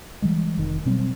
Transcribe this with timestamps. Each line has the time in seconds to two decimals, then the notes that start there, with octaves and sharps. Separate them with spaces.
0.22 E3 G3 G#3
0.58 F1 D#3
0.86 B2 F#3 G3 C4